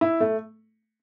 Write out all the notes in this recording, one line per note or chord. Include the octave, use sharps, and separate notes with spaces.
E4
A3